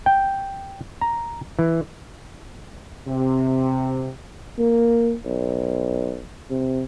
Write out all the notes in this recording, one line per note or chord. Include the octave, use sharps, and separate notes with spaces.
G5
A#5
E3
C3
A#3
B1
C3